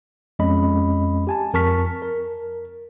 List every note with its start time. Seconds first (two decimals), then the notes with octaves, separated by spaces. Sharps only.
0.39 F2 G#3 C#4 D#5 B5
1.27 G4 G#5 A5
1.53 F2 A#4 A5 C#6 F6 B6
2.02 A#4